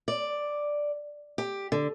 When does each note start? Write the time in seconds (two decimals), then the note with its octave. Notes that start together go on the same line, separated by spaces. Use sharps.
0.08 D5
1.38 G4
1.72 D3